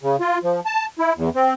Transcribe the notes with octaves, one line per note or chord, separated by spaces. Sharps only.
C#3
F4
F3
A5
E4
E2
C4